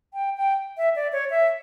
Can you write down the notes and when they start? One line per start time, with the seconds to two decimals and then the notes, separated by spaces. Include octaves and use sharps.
0.14 G5
0.37 G5
0.77 E5
0.96 D5
1.12 C#5
1.30 E5